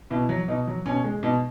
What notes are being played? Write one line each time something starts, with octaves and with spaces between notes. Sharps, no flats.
B2 E4
F#3
B2 D#4
F#3
B2 C#4
G#3
B2 D#4